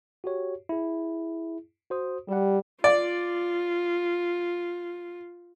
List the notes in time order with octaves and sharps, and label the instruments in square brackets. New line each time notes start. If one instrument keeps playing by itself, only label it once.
[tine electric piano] F#4 G4 C#5
E4 G#4
F#4 C5 D#6
[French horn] G3 [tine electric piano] G4 F#5
[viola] F4 [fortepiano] D5